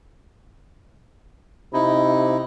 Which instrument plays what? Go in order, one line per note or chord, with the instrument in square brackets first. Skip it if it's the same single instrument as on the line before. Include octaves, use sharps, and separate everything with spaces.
[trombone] C3 [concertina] D#4 E4